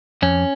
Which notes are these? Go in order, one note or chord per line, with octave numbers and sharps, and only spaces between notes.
F2 C#4